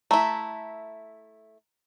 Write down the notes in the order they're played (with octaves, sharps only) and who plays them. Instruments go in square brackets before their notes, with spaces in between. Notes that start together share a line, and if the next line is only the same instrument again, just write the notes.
[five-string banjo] A3 E4 [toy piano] A#5